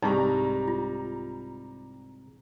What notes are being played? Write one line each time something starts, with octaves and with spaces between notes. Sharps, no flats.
C2 G#2 G3 D#4 G4 A#5 C#6
F4